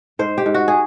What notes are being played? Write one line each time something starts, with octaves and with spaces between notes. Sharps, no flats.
G#2 C5
G4
G#2
F#4
G#4